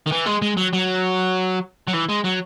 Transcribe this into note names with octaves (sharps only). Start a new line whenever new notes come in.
D#3
E3
G#3
G#3
F#3
F#3
F#3
E3
G#3
F#3